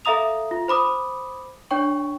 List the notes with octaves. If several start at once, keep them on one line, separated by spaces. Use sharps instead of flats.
A4 E5 F5 A#5 D#6 F7
F4
C5 B5 D6 D#6
D4 C#5 G5 C#6